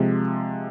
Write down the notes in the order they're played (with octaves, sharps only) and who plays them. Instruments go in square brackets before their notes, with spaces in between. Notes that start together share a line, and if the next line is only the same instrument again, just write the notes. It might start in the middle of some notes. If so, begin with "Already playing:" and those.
Already playing: [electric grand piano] C3 F3 G#3